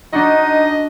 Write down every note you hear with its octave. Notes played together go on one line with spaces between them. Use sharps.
D4 D#4 F#4 D#5